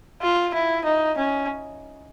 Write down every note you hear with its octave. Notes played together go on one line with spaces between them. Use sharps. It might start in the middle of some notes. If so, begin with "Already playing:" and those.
F4
E4
D#4
C#4